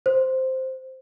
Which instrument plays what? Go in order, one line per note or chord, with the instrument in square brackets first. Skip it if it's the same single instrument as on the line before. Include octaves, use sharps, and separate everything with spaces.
[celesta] C5